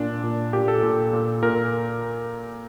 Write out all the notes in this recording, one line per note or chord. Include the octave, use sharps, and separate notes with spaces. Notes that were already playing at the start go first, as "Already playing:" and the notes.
Already playing: A#2 D4
A#2
A#2 G4
A4
A#2
A#2
A#2 A#4